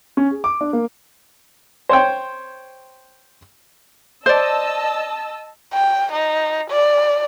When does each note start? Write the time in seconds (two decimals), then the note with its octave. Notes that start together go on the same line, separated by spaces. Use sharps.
0.17 C#4
0.31 G#4
0.44 D6
0.61 D4
0.73 A#3
1.89 C5 C#5 G5
4.26 C5 D5 D#5 A5 E6
5.74 G5
6.13 D#4
6.71 D5